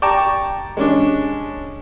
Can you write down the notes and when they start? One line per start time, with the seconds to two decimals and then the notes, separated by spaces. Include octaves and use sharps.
0.02 D5 G5 A5 A#5 C#6
0.77 G#3 C#4 D4